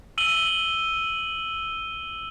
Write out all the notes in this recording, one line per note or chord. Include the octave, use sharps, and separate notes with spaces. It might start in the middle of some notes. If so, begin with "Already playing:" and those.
E6 D#7 F#7 G7